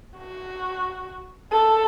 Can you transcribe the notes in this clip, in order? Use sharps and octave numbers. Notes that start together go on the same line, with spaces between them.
F#4
A4